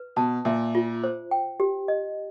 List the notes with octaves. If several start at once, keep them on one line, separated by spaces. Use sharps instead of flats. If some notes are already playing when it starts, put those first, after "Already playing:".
Already playing: B4
B2 A5
A#2 E5
F4
C5
G5
G4
D#5